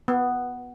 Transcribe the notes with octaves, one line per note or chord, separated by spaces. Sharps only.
B3